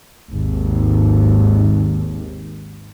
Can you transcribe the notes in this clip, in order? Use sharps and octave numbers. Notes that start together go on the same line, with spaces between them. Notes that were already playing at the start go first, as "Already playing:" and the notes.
G#1 D#2